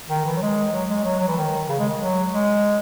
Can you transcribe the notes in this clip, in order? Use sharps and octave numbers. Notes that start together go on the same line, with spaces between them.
D#3
E3
F#3
G#3
F#3
G#3
F#3
F#3
E3
D#3
C#3
G#3
F#3
G#3